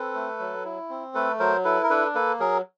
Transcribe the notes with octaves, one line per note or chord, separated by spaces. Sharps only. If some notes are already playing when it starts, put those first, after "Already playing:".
Already playing: C4 A4 B4
A3
F#3
E4
C4
A3 A4 B4
F#3 A#4 C5
E4 A4 B4
A#4
D4 A4 B4
A#3 A4 B4
F#3 G#4 A#4